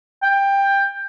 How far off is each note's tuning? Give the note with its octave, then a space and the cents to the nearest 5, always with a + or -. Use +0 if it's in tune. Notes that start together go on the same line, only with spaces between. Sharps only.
G5 +15